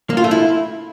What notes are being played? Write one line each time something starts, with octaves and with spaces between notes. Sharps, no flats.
A#3
F4
A3
E4